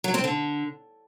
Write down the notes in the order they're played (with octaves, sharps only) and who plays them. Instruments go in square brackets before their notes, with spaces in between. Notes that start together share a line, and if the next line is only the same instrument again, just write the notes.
[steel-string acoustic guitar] F#3
C4
D3